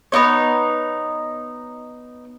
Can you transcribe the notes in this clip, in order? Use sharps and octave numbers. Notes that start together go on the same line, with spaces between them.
B3 C#4 D#4 C#5